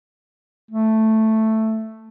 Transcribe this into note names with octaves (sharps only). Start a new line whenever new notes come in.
A3